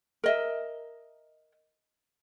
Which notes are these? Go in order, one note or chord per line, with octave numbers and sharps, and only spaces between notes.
A#4 D#5 E5